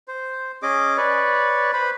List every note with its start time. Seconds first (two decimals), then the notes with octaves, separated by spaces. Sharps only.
0.08 C5
0.63 C#4 G#4 D#5 D6
0.97 B4 C#5 D5
1.73 B4 C5 B5